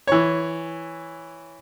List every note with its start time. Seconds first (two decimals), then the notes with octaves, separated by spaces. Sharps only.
0.07 E3 C#5